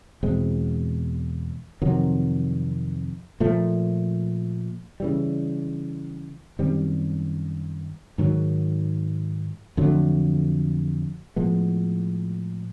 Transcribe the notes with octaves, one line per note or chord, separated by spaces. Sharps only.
E2 B2 G#3 C4
F2 C3 D#3 F#3
A#2 F3 A3
C#3 E3 G3
F#2 D#3 G3 C4
G#2 D#3 F#3
F2 D3 F#3 A3
A2 F3 G#3 B3